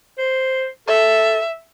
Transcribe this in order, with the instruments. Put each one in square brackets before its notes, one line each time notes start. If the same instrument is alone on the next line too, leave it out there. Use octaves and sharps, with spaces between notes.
[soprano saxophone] C5
[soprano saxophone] A4 [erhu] E5